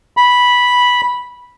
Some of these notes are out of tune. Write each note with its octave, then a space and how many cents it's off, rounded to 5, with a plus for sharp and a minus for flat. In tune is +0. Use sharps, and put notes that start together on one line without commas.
B5 -10